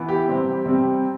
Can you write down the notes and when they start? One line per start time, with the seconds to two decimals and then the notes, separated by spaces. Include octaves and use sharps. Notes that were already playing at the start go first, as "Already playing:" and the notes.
Already playing: E3 B3
0.09 G4
0.28 C3 G3 C4
0.66 C3 G3 C4